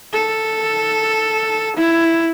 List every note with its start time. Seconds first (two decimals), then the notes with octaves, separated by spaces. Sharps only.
0.13 A4
1.76 E4